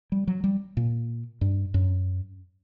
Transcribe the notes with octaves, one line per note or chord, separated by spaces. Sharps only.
G3
F#3
G3
A#2
G2
F#2